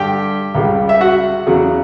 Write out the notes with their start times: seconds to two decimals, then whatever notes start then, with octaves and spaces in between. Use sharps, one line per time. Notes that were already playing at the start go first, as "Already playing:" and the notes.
Already playing: G2 D3 G3 G4 G5
0.55 C#2 C#3 G3
0.89 E5
1.01 F#4 F#5
1.47 E2 C#3 F#3